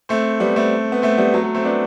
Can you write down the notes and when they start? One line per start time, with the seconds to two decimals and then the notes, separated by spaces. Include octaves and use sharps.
0.09 A3 C4
0.40 G3 B3
0.56 A3 C4
0.92 B3
1.02 A3 C4
1.18 G3 B3
1.34 F#3 A3
1.44 F#3
1.55 A3 C4
1.65 B3 D4